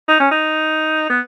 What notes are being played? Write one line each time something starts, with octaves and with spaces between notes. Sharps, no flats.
D#4
C#4
D#4
B3